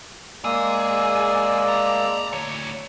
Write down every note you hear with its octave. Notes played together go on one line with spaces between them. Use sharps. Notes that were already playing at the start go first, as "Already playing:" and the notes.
G#3 A#3 G#4 D5 E6
A5 A#5
D2 C#5